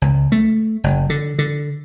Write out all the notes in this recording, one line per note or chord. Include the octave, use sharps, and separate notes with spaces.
C#2
A3
F#1
D3
D3